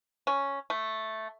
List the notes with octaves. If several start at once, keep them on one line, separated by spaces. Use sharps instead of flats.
C#4
A3